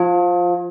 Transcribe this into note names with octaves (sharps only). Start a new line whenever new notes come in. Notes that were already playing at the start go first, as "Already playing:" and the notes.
Already playing: F3